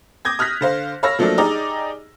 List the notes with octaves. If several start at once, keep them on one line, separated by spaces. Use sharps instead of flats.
D6 D#6 G6 G#6 A#6
D#6 F6 F#6 A#6 B6
D3 C5 F5
C#5 F5 B5 E6 F6 A#6
F3 F#3 A3 A#3 D4
D#4 G4 G#4 D5 D#5 A#5